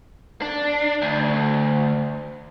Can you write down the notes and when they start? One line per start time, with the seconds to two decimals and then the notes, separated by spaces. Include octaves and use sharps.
0.42 D4
1.02 D2